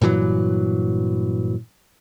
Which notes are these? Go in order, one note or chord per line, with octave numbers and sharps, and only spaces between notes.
G2 A#2 E3 F#3